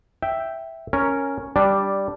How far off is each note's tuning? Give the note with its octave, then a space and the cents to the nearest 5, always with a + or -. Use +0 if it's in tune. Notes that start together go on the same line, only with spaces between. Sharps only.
E5 +0 G5 -5
C#4 +0 A#4 +0
G3 +0 D4 -5